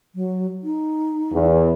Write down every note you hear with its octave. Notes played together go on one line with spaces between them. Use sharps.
F#3
D#4
E2